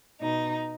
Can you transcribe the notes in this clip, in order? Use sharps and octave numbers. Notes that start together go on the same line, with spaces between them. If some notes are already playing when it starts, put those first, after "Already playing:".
B2 D#4